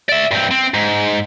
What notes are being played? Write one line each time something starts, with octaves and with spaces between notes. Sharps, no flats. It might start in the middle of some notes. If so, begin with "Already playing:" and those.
D5 E5
G2 C4
C4
G#2